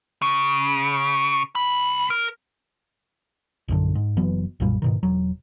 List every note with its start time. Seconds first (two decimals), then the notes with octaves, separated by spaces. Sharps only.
0.22 C#3
1.55 C2 B5
2.10 A#4
3.68 A#1 F#2 D3
3.95 G#2
4.17 F#1 E3 F#3 B3
4.60 B1 F#2 A#2 G3
4.82 G#2 B2 D#3
5.03 E1 F#3